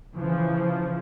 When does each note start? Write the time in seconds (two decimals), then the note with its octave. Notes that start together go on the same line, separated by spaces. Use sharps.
0.13 C#3 E3 F3